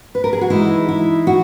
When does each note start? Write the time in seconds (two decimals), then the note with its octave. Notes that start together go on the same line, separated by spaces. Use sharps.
0.15 B4
0.24 A#4
0.33 G#4
0.41 F#4
0.50 E3 G#3 D#4 E4
0.89 E4
1.27 F#4